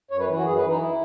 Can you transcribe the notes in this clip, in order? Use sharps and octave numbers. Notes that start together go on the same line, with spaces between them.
F#2 C#5
B4
E3
F#4
F#2 G#4
B4
E3
D#4
E4